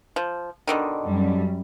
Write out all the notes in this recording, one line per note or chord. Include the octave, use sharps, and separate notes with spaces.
F3
B2 D3 D#3
F#2 G3